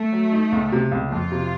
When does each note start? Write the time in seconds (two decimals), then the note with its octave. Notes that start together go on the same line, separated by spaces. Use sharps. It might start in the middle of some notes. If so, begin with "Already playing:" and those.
Already playing: A3
0.13 F#3
0.32 D#4
0.52 C#2
0.72 C3
0.91 C#2
1.11 F2 F4
1.31 C3